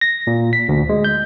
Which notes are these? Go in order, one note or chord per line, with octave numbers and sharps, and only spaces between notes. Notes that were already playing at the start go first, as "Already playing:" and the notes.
A#6
A#2
B6
D2
G#3
G6